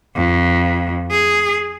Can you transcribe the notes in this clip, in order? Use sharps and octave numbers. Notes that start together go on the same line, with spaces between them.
F2
G#4